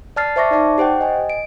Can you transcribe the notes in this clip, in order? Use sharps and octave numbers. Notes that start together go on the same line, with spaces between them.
D5 A5 F6 A6 C7
C5 E5 A5 C#6 D6 A#6
D#4 D5 A5 D6
G4 C5 F#5 G5
D#5 G#5
D7